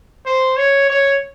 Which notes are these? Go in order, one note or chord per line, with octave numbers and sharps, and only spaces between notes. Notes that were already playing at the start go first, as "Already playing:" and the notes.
C5
C#5
C#5